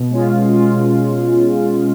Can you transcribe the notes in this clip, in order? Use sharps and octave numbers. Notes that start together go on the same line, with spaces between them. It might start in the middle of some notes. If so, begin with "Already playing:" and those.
Already playing: B2
G#3 C#4 F4
B2
G#3 C#4 F4
B2